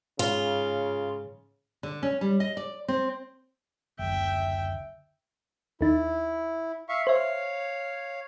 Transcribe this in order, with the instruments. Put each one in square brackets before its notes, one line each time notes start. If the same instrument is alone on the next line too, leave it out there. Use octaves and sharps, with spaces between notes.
[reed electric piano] G#2 [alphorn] C#3 [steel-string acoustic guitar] F4
[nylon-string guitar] D3
C#4
G3
D#5
D5
C4
[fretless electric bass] F#1 D2 [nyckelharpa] E5 G5
[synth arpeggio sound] D#2 D#4 [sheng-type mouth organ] E4
[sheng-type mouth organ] E5 F5 C#6
[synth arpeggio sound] C5 E5 [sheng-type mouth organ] C#5 F5